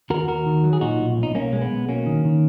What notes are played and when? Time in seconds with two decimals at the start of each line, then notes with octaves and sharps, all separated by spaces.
0.10 D#2 F#4 A#4
0.28 D#2 F#4 A#4
0.46 D#3
0.64 F#3
0.73 G#4
0.81 A#2 D#4 F#4
0.99 B1
1.17 B1
1.23 D#4
1.35 B1 A#3 C#4
1.53 G#3 A#3
1.61 B3
1.71 B1
1.89 F#3 A#3 C#4
2.06 D#3
2.25 D#3